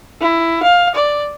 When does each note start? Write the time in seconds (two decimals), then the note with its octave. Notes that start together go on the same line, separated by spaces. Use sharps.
0.21 E4
0.63 F5
0.95 D5